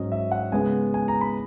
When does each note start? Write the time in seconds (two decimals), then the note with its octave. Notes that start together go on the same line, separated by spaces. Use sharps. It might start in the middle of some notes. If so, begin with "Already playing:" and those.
Already playing: G#2 F#3 C#4 D#5
0.12 E5
0.31 F#5
0.52 C#3 G#3 B3 G#5
0.94 G#5
1.08 A#5
1.21 B5